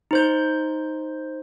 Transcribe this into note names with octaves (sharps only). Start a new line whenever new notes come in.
D#4 C5 G6